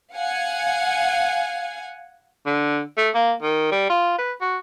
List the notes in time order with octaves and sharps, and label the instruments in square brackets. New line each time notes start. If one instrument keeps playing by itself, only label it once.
[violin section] F5 F#5 G#5
[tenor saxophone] D3
A3
A#3
D#3
G3
F4
B4
F#4